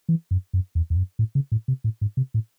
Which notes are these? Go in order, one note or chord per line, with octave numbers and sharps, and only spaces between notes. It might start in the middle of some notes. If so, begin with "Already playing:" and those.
E3
F#2
F#2
E2
E2
F#2
A2
C#3
A2
C3
A2
G#2
C3
A2